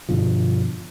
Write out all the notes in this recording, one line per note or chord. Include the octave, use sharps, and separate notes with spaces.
G2 B2 D3 F3